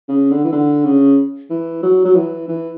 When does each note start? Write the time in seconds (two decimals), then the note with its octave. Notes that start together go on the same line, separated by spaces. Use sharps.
0.08 C#3
0.31 D3
0.44 E3
0.52 D3
0.84 C#3
1.50 E3
1.83 F#3
2.05 F#3
2.16 E3
2.48 E3